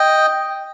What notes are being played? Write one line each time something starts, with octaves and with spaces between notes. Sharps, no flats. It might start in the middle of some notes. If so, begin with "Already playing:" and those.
Already playing: D#5 G5